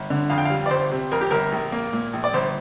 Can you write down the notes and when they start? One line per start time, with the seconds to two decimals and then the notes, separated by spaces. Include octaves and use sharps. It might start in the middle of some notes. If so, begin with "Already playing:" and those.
Already playing: G1
0.10 D3
0.30 F2 F5
0.38 G5
0.45 F5
0.50 G3
0.66 D5
0.71 G1 C5
0.91 C3
1.12 F2 A#4
1.21 G4
1.31 G1 A#4
1.52 A#1
1.72 A#3
1.93 A#2
2.13 A#1
2.24 D5
2.34 G1 C5